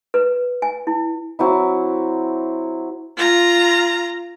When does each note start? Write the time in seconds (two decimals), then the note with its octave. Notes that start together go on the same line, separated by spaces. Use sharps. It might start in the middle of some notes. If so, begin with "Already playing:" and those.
0.14 B4
0.62 G#5
0.87 E4
1.39 F#3 C4 E4
3.17 F4 A#5